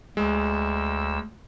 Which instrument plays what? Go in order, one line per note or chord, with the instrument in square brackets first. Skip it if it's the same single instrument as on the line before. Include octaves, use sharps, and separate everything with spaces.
[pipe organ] D2 E6 [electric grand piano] G#3